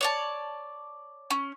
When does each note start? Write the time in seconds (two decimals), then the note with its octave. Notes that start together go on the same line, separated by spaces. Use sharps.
0.01 C#5 D5 A5
1.30 C#4